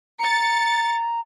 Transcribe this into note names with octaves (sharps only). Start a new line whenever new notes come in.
A#5 A6 C#7